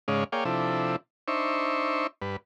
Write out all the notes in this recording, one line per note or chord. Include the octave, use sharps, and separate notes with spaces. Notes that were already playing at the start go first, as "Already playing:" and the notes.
G#2 C#3 G#3 C#4 D5 F5
A#3 G#4 C#5 D5 F5 G5
C3 F3 D4 E4 A4
D4 D#4 C5 E5 C#6
G2 B4